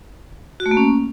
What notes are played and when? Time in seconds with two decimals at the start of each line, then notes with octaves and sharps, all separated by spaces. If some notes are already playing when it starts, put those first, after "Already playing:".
0.60 F#4
0.66 A3
0.71 A#3
0.77 C#4